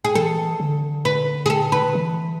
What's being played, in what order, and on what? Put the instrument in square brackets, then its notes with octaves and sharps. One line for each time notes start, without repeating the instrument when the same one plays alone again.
[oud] G#4
[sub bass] E3 [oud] A4
[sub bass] D3
[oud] B4
G#4
A4
B4
[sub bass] E3